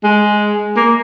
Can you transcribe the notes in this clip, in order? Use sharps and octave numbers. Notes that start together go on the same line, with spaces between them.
G#3
A#3